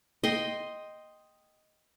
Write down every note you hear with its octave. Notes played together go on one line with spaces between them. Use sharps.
D#5 G5 C6